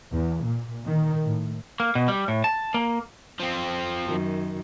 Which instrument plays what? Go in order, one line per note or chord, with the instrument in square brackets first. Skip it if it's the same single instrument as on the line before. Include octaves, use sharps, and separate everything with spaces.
[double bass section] E2
A#2
D#3
A2
[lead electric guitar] A#3
B2
G3
A2
A5
A#3
[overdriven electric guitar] F3 C4
[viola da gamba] F#2 D#3